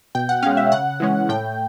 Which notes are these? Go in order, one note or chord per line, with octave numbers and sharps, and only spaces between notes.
B2 G5
F#5
G#3 C#4 F5
E5
C#3 F#5
E3 G#3 C#4
A2 G5